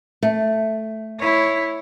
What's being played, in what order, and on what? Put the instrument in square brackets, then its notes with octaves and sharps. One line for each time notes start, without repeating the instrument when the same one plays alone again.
[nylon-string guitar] A3
[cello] E4 C#5